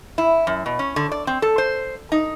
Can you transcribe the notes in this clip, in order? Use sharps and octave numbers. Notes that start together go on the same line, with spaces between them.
E4
F#2
B2
C#4
D3
D5
C4
A4
C5
D#4